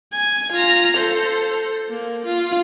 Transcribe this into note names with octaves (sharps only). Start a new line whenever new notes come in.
G#5 G#6
F4 A#5
A4 C5
A#3
F4